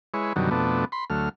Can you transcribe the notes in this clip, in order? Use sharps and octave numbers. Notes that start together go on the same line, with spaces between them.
G#3 E4 B4 C#5
F#2 B2 D3 D#3 F#3 G3
F2 B2 A3 B3 D4
B5 C6
D2 F#3 A3 F6